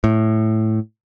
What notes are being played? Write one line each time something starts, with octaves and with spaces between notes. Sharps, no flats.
A2